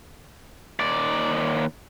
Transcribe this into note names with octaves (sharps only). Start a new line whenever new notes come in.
D#2 D5